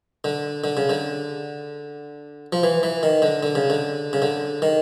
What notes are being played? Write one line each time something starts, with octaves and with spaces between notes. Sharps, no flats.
D3
D3
C#3
D3
F3
E3
E3
D#3
D3
D3
C#3
D3
C#3
D3
D#3